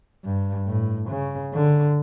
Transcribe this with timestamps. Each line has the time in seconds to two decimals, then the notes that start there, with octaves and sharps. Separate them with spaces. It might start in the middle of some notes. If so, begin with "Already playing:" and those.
0.24 G2
0.67 A2
1.09 C#3
1.53 D3